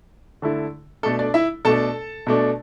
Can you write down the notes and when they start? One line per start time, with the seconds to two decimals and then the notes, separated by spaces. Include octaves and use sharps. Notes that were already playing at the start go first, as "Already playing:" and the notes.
0.42 D3 A3 E4
1.03 B2 A3 D4 A4
1.19 D4 D5
1.34 E4 E5
1.65 B2 A3 D4 A4 A5
2.27 B2 A3 D4